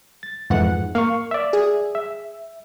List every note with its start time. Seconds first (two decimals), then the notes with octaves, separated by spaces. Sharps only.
0.23 A6
0.50 F2 G#2 E3 F#5
0.95 A#3 F5 C#6
1.31 D5 E5
1.53 G#4
1.95 E5